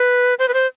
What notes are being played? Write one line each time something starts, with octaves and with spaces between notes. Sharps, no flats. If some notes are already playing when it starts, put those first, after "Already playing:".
Already playing: B4
C5
B4
C5